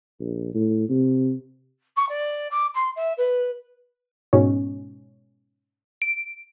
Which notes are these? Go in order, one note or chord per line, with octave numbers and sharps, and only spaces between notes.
A#1
A2
C3
C#6
D5
D6
C6
E5
B4
G#2 B2 C#4
D7